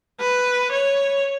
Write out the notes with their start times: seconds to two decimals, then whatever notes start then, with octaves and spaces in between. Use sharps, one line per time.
0.20 B4
0.72 C#5